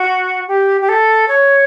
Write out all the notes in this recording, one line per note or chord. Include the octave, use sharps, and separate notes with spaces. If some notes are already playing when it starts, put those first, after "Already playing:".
Already playing: F#4
G4
G4
A4
C#5